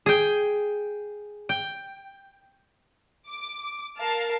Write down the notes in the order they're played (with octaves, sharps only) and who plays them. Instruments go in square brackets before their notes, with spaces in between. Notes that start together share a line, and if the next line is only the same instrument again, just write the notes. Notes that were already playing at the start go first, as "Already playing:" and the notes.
[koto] G#4 G5
G5
[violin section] D6
A#4 F5 A5